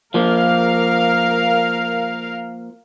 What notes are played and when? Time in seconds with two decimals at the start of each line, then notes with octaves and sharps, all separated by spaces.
0.14 F3 A#3 A#4 F5